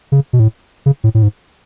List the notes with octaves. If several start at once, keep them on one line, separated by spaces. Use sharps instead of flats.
C#3
B2
A2
C#3
A2
A2
G#2